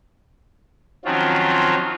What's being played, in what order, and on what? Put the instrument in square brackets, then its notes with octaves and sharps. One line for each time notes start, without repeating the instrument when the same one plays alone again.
[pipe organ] D#3 F3 F#3 C4 C#4 F4